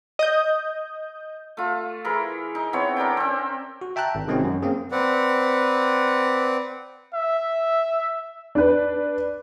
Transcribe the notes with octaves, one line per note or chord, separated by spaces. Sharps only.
D#5 D#6 G6
A3 F4
E3 E4 G#4 A#4
D#4
E3 B3 C4 C#5
D4 A#4 D5 G5
C4 C#4
F#4
E5 G5 A5 A#5 F#6
G#1
C3 D#3 G#3 C4 C#4 F#4
F#2
A#3 C4 C#4 G#4
C4 B4 D5 F#5
E5
D4 B4